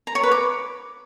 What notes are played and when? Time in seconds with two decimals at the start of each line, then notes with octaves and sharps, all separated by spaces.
0.07 A#5
0.15 C#5
0.23 B4
0.32 D6